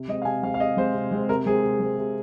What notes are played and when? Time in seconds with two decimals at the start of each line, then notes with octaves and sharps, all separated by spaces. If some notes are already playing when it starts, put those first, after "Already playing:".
Already playing: C3
0.08 G#3 C4 D#5
0.22 F5
0.25 C3 G#5
0.43 G#3 C4 F5
0.54 F5
0.60 C3 D#5
0.77 G#3 C4 C5
0.94 C3
1.11 G#3 C4
1.29 C3 A#4
1.46 G#3 C4 G#4
1.63 C3
1.80 G#3 C4
1.98 C3